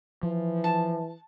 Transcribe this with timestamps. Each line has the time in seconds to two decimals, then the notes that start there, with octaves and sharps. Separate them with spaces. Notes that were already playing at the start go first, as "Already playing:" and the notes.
0.23 E3 F3
0.64 A5